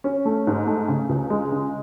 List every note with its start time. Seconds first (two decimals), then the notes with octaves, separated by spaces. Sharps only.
0.04 C#4
0.25 A3
0.47 G#2
0.67 A3
0.88 C#3
1.09 C#2
1.30 G#3
1.52 C#3